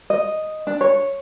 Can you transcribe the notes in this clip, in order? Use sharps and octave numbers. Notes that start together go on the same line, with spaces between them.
D#5
D4
C#5